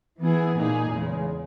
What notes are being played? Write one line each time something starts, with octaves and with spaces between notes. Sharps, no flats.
E3 B3 E4 G#4
A#2 A#3 D#4 G#4
E2 C#3 G#3